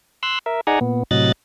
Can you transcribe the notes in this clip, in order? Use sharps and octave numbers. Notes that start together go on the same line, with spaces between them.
C6 E6 F#6
A#4 E5
D#4 G#4 D5 F#5 G#5 A#5
A#2 B3
A2 C3 F#3 D#5 F#6 A6